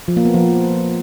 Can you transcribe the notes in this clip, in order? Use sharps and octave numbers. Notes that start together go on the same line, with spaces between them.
F3
A#3
B3
F3